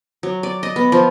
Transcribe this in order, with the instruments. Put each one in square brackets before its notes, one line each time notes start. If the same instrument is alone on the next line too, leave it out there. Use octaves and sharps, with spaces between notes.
[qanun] F#3
D5
D#5
B3
F3